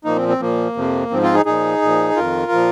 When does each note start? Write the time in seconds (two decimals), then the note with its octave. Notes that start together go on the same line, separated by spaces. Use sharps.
0.05 A#2 F3 A#3 D#4
0.16 C4
0.29 C4
0.40 A#2 F3 A#3
0.76 F2 C3 F3
1.11 G#2 F3 C4
1.22 C4 F4
1.34 D#4 G#4
1.46 A#2 F3 D#4 G#4
1.82 A#2 F3
2.16 F2 D#3 F4 A#4
2.52 A#2 F3